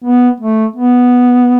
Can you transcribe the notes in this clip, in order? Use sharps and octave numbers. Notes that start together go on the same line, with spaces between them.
B3
A3
B3